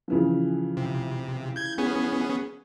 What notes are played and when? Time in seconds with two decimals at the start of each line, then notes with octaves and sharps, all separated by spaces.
0.08 C#3 E3 F3
0.77 C3
1.56 G6 G#6
1.78 B3 C#4 G#4